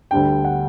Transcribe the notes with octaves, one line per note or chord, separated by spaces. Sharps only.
D2 D3 G3 D4 G5
F#5